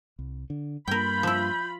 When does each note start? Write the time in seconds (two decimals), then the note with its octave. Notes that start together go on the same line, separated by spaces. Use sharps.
0.19 C2
0.50 D3
0.88 G2 A#3 F4 A#4 G5 B5 G6
1.23 F3 E4